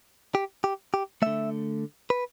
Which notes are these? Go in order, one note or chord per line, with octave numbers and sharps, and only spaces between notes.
G4
G4
G4
D3 A3 E5
B4